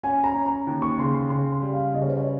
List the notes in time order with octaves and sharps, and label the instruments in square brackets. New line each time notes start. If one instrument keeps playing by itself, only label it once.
[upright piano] C#4 [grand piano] G#5
[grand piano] A#5
[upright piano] C#4
[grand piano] A#5
[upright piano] D#2
[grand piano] C#6
[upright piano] C#3 [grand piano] C6
[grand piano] C6
[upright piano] C#3 [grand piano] C6
[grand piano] C6
[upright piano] G3
[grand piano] F5
[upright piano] C#3 [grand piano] D#5
[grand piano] C#5
C5
C#5